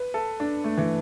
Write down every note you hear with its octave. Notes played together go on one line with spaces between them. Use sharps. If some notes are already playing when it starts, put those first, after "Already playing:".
Already playing: B4
A4
D4
A3
E3